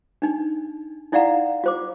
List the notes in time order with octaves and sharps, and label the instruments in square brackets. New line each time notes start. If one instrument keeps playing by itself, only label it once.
[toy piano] D4 D#4
D#4 E4 D5 F5 F#5 A#5
F4 C5 D6